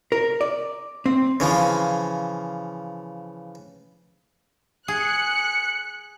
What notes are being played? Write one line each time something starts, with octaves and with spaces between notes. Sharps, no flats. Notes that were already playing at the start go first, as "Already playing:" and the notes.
A#4
D5
C4
C#3 E3 F3
G#4 F#6 C#7